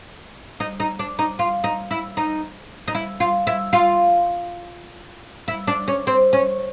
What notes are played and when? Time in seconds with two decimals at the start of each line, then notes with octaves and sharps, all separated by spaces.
0.60 D#4
0.80 D#4
0.99 D4
1.19 D#4
1.39 F4
1.64 D#4
1.91 E4
2.17 D#4
2.88 D#4
2.95 E4
3.20 F4
3.47 E4
3.73 F4
5.48 E4
5.67 D4
5.88 C#4
6.07 C4
6.33 C#4